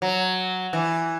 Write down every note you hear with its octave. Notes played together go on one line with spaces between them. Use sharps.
F#3
E3